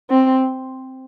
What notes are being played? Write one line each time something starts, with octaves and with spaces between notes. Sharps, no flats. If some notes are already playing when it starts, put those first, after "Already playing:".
C4